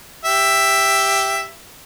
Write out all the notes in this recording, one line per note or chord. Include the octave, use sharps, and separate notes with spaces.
G4 E5